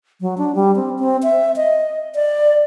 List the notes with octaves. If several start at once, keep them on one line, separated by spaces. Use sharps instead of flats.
F#3
D4
G3
C4
C4
E5
D#5
D5